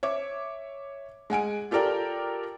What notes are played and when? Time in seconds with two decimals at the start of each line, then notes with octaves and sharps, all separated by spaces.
0.03 C#5 E5 D6
1.30 G#3 F#5 G#5 D7
1.71 F4 G4 A4 A#4 D5 G5